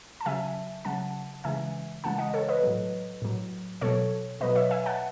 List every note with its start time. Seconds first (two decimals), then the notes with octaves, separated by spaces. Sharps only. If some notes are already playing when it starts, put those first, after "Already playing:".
0.21 A5
0.26 C#3 F#3 E5 G#5
0.85 C#3 F#3 F#5 A5
1.44 C#3 E3 G#3 E5 G#5
2.04 C#3 E3 G#3 F#5 A5
2.18 D#5 F#5
2.33 A4 C#5
2.49 B4 D#5
2.63 A2 F#3
3.22 A2 F#3
3.81 B2 F#3 A4 C#5
4.40 B2 F#3 B4 D#5
4.55 C#5 E5
4.71 E5 G#5
4.86 F#5 A5